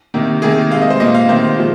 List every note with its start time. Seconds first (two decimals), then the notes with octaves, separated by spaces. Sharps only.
0.14 C3 D#3 A#3
0.42 C3 D#3 A#3 G#4
0.71 G#3 F5
0.75 C3
0.82 D#5
0.90 C5
1.00 A#2 A#3 D#5
1.15 F5
1.29 C3 D#3 A#3 C5
1.58 A#2 F3 G#3